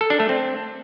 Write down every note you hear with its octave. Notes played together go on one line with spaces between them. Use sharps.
A4
D4
A3
C4